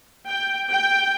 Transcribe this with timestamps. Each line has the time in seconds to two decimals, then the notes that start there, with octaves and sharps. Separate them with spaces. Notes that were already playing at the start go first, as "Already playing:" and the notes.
0.29 G5
0.70 G5